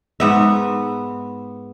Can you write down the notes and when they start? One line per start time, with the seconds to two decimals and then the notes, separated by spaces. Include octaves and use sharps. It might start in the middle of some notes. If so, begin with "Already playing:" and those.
0.20 G#2 B3 E5